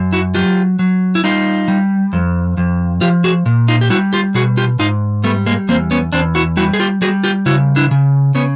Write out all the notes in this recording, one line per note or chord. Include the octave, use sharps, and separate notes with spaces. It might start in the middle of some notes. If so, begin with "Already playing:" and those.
Already playing: F#2
E4 F#4
F#3 F4 G4
F#3
E4
G3 D#4 F4
G3
F2
F2
F3 F4 G4
F#4 G#4
A#2
D#4 F4
G4
G3 E4 F#4
F4 G4
B2 F#4 G#4
F4 G4
G#2 D#4 F4
G3 A3 B3
G#3 A#3
E2 A#3 C4
B3 C#4
E2 C4 D4
E4 F#4
G3 E4 F#4
G#4
F4 G4
G3 F#4 G#4
F4 G4
C#3 E4 F#4
D4 E4
C#3
C#3 B3 C#4